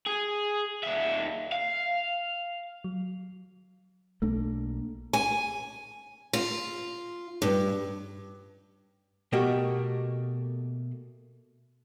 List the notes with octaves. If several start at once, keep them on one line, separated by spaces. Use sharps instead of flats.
G#4
D#2 E5
F5
F#3
B1 A3 A#3 D4
G#5
F4
G2
B2 A3 A#3 F#4 G4